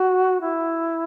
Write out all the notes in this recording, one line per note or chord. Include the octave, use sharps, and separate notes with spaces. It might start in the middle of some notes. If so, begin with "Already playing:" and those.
Already playing: F#4
E4